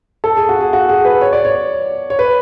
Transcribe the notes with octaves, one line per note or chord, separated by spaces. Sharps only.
A4
G#4
F#4
G#4
F#4
G#4
B4
C#5
D5
C#5
C#5
B4